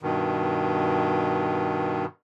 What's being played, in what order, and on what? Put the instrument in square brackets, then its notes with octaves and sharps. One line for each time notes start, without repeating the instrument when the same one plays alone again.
[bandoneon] G2 B2 D#3